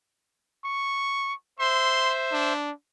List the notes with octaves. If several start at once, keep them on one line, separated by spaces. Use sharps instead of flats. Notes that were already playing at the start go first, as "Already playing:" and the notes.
C#6
C5 E5 C6
D4